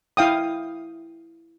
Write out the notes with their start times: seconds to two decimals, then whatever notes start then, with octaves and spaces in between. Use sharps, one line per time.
0.17 E4 F5 G5 D#6